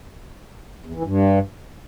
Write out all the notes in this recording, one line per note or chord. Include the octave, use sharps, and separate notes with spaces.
E2
E3
G2